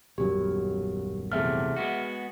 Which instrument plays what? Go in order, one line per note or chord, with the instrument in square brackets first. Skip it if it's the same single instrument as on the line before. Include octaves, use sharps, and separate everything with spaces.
[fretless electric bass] D#1 B1 F#2 [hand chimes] G4
[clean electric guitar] E2 C3 A3 [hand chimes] G#4 E5 F6
[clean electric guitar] G#3 B3 F#4